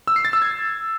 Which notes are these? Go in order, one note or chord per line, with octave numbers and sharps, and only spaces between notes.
E6
C7
A6
E6
G#6